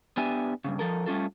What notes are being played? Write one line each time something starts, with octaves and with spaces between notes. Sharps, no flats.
B3 D4 G4 E5 G#5
G2 A#2 C#3
F3 A4 A#4
G3 A3 C#4 F4 A4